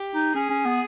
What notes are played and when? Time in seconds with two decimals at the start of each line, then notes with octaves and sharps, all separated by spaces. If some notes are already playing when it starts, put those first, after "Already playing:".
Already playing: G4
0.15 D#4
0.35 C#4 G#4
0.50 C#4
0.65 B3